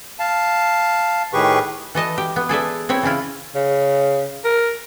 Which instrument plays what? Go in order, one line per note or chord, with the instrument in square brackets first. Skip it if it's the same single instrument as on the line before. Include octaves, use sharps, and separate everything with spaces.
[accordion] F5 A5
A2 D#3 G4 G#4 B4 C#6
[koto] E3 A4 D#5 A5
G4
B3
G#4 A4 D5 E5
C4 E4 C#5 E5
C#3 E3 E4 F4
[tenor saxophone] C#3
A#4